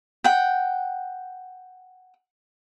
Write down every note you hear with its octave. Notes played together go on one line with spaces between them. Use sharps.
F#5 G5